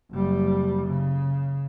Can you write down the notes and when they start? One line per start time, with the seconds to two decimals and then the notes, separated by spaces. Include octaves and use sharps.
0.11 F#1 G3
0.87 C#3